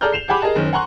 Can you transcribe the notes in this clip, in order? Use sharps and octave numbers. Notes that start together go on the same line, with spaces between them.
G#4 A4 D5 A#5 F6 G6
C7 E7 F7
G4 G#4 F#5 G#5 B5 D6
G#4 A#4 D#5 A5
F#1 D#3 C#4
F#5 G#5 A#5 C6 C#6 F#6